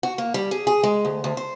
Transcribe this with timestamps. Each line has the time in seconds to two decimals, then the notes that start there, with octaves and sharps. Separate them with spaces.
0.03 F#4
0.18 A#3
0.34 G3
0.51 G#4
0.67 G#4
0.83 G#3
1.05 D2
1.24 D2
1.37 C5